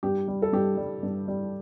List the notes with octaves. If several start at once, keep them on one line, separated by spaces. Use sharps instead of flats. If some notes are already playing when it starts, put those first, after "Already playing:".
G2 G4
G3
A4
G2 G4
G3
G2
G3